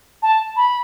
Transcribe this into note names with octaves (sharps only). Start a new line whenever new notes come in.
A5
B5